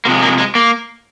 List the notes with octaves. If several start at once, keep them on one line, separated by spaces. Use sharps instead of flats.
C3 F3 G#3 A#3
A#3
G#3
A#3